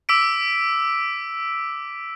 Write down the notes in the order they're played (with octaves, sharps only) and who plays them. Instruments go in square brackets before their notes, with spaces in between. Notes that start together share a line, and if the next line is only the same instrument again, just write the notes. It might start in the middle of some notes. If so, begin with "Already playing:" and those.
[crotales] D6 E6 B6 D7